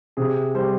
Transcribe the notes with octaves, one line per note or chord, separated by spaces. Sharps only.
C3 G#4
G3 C5